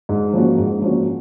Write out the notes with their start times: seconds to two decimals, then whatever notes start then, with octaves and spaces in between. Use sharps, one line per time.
0.09 G#2
0.33 F3 A#3 C#4 F#4
0.58 G#2
0.82 F3 A#3 C#4 F#4